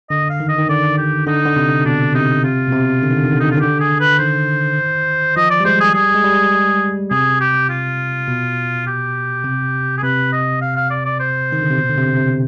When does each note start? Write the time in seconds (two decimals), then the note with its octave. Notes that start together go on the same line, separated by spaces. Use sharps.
0.10 D3 D#5
0.30 F5
0.40 D#3
0.49 D#5
0.58 D#3
0.69 D3 D5
0.98 G4
1.27 D3 D#4
1.46 D3
1.56 C3
1.85 B2 D4
2.14 C3 D#4
2.44 C3 F4
2.67 B2
2.73 C3
3.03 D3
3.11 D#3
3.17 D3
3.25 D#3
3.33 D3
3.40 D#3 D#4
3.48 D3
3.51 F4
3.57 D#3
3.60 D3 G4
3.80 G#4
4.00 B4
4.19 D#3 C5
5.37 F3 D#5
5.50 D5
5.60 G3
5.65 G#3 C5
5.80 G#4
5.94 G3 G#4
6.15 G#3
6.24 G3
7.11 C3 G#4
7.41 G4
7.69 F4
8.28 B2
8.87 G4
9.45 C3
9.98 G#4
10.03 C3 B4
10.33 D#5
10.61 F5
10.76 F5
10.90 D5
11.05 D5
11.20 C5
11.52 D#3
11.62 D3
11.70 C3
11.78 B2
11.89 D3
11.98 C3
12.17 C3